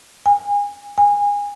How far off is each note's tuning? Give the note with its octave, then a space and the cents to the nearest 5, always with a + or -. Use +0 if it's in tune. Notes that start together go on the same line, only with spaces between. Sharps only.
G#5 -30
G#5 -25